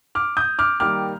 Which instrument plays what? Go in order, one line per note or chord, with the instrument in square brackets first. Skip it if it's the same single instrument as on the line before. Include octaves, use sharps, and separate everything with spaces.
[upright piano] D6 F6
D#6 G6
D6 F6
D#3 G3 A#3 D6 F6